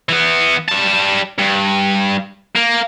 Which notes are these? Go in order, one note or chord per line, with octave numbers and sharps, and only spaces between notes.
E3 B3
G3 A5
G2
A#3